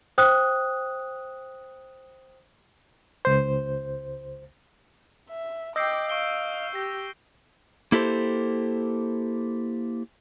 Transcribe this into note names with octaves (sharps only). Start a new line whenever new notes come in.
C5 G5 D#6 F#6
C#2 C5
E5
D#5 G5 D6 E6 G6 C7
F5 C#6 D7 G7
G4 A#6
A#3 E4 G4 A4 C5